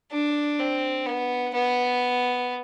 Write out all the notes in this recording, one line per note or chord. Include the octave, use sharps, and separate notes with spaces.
D4
C4
B3
B3